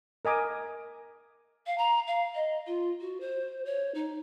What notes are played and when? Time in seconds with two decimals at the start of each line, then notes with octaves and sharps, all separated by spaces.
0.25 A#4 D#5 G#5 D6 D#6
1.67 F5
1.78 A#5
2.07 F5
2.35 D#5
2.67 F4
3.01 F#4
3.21 C5
3.65 C#5
3.95 D#4